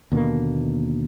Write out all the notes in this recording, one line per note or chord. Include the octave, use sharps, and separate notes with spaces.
D#2 B2 D3 A#3